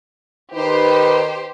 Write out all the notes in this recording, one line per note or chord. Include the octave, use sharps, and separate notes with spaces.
D#3 D#4 G4 B4 C5